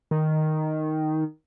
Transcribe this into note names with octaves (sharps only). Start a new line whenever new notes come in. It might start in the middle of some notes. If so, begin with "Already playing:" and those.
D#3